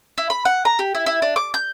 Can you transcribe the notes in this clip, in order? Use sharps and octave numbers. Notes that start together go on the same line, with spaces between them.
E4
B5
F#5
A#5
G4
E4
E4
D4
D6
G6